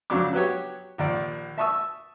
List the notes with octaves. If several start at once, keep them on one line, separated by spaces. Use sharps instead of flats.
F2 C#3 F#3 D4 C#6 D6
F#3 B3 G4 C#5
A#1 D#2 D5
E5 A5 C#6 D#6 E6